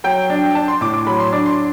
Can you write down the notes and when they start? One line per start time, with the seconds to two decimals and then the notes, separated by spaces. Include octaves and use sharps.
0.04 F#3 G5
0.30 D4
0.55 D4 A5
0.68 C6
0.81 A2 D6
0.94 D6
1.07 F#3 B5
1.20 C6
1.32 D4 D6
1.46 C6